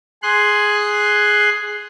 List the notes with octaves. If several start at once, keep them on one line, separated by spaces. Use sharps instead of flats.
G#4 C6 F#6